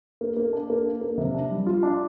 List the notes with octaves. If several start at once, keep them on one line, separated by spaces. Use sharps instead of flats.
A#3
A#3
D4
A#3
D4
A#3
C3
D4
G3
F4
D4